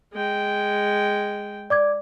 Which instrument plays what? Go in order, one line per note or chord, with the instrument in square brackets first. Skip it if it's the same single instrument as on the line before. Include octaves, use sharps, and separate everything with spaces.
[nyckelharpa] G#3 G5
[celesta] D5 D6 G#6